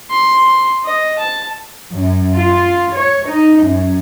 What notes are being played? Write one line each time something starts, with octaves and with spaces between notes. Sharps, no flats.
C6
D#5
A5
F#2
F4
C#5
D#4
F#2